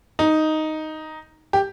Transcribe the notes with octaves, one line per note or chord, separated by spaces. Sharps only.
D#4
G4